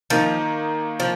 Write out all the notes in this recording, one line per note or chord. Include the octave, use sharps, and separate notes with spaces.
D#3 F3 A#3 D#4
F3